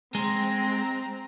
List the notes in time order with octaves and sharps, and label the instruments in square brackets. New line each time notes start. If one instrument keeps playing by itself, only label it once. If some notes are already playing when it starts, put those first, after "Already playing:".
[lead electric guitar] G#3 [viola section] C4 [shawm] A#5